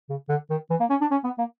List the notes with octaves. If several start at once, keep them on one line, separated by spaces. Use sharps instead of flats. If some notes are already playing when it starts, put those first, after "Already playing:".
C#3
D3
D#3
E3
A#3
C#4
D4
C#4
B3
A#3